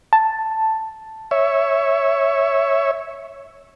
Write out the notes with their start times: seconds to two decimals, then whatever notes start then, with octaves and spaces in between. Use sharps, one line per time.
0.13 A5
1.31 C#5 E5